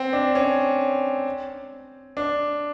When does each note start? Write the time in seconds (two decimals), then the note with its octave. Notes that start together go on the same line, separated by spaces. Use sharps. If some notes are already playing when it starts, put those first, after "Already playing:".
Already playing: C4
0.13 D4
0.35 C#4
2.17 D4